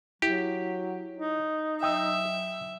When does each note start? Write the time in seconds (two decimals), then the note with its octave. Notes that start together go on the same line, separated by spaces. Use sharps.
0.22 F#3 E4 G4
1.17 D#4
1.83 F#3 E5 G5 D#6 E6